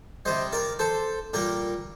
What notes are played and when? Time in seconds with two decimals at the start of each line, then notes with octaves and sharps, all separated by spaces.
0.25 C3 G3 C5 D#5
0.52 A#4 D5
0.79 A4 C5
1.33 A#2 G3 G4 A#4